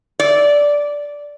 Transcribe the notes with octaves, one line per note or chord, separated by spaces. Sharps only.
D5